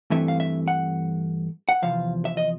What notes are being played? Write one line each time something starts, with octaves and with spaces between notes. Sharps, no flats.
G2 E3 A3 C4 E5
F5
E5
F#5
F#5
E2 C3 F3 F5
E5
D#5